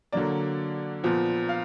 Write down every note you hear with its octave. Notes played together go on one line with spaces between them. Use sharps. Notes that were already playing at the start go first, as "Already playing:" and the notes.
D3 F#3 A#3 D5
A#2 F3 B3
F5